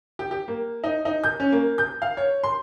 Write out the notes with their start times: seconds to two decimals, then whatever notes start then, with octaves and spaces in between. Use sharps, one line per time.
0.19 G4
0.31 G4
0.48 A#3
0.84 D#4
1.05 D#4
1.24 G6
1.40 C#4
1.52 A#3
1.78 G6
2.02 F5
2.17 C#5
2.43 C6